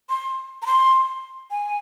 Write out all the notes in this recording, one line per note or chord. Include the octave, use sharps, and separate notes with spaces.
C6
A#5
C6
G#5